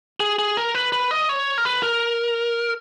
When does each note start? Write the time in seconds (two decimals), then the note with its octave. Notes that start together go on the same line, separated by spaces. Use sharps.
0.20 G#4
0.39 G#4
0.57 A#4
0.75 B4
0.92 B4
1.11 D#5
1.29 C#5
1.58 A#4
1.65 B4
1.83 A#4